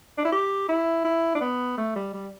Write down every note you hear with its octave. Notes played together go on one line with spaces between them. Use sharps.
D4
E4
G4
E4
E4
D4
B3
A3
G3
G3